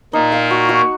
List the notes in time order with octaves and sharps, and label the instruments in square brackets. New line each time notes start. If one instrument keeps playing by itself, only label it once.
[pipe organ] A#2 A#3 [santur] D#4
[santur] F5
F#4
F#4